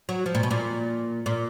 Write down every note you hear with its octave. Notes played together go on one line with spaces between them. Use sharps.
F#3
F3
A#2
B2
A#2
A#2